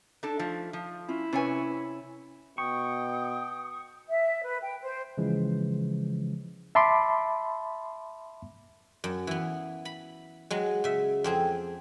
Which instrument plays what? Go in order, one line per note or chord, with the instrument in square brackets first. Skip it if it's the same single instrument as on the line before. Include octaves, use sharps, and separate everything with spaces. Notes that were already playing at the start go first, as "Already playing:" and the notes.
[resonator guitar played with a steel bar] D4 A4 [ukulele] D#4
[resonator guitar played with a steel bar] F3 A3
F3
[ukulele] C#4 F4 [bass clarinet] E4
[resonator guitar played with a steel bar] C3 C#5 G#5 [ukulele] C#4 B4
[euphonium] B2 [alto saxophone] G5 [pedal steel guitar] C#6 [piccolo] D#6
[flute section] E5
B4
G5
C5
[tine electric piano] C#3 E3 F3 G#3
[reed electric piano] E5 A5 B5 C6 D6
[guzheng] F#2
E3 B3
B5
F#3 G#3
C#3 E5
F2 C4 G#4